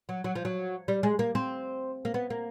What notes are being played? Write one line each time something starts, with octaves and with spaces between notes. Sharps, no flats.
F#3
F#3
F3
F#3
G3
G#3
A#3
C4
A#3
B3
A#3